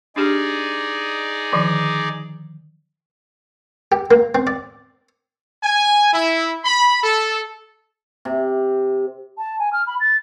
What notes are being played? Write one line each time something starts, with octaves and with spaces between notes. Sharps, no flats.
D4 D#4 G4 G#4 D5
D3 D#3 F3
G4
A#3
C4
D5
G#5
E4
B5
A4
C3
A5
G#5
F6
B5
A6